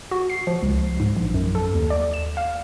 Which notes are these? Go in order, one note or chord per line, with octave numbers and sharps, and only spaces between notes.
F#4
C7
F3
C#2
G#2
A#1
F#2
A4
D#2
D5
E7
F5